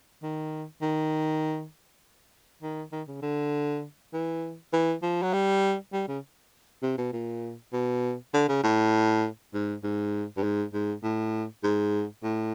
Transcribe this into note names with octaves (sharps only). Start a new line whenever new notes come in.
D#3
D#3
D#3
D#3
C#3
D3
E3
E3
F3
F#3
G3
G3
C#3
C3
B2
A#2
B2
D3
C#3
A2
G#2
G#2
G2
G#2
G#2
A2
G#2
A2